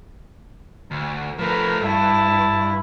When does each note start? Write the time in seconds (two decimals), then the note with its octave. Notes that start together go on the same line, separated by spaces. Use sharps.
0.91 D2
1.39 F3 A3 A#4 B4
1.81 G2 E4 A5